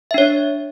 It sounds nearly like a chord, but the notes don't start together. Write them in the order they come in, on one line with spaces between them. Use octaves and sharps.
E5 D4 C#5